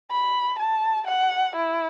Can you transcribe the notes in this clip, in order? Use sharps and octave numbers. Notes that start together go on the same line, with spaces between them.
B5
A5
F#5
E4